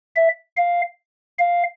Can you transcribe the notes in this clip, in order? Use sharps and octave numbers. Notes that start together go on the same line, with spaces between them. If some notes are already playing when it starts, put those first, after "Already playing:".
E5
F5
F5